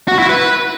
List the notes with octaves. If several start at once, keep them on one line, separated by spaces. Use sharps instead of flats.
F#4
E4
B4